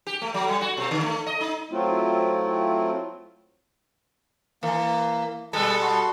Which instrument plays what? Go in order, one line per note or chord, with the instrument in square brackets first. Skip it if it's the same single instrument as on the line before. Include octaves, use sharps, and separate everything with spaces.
[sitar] G4
A3
F#3
G3
F#4
B2
D3
A3
D#5
D#4
[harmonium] F#3 A3 C4 E4 F4
[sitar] E3 [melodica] A#3
[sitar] B2 G3 A4 [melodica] G#3
[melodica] F#4 C6